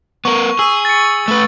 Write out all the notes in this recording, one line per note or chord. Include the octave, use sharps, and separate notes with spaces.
B3 A#4 C#6
G#4 E6
A6 C#7
A3 B4